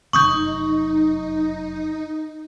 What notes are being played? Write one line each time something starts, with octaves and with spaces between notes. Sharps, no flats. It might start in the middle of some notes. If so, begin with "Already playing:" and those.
F1 F#2 D#4 C#6 D#6 G6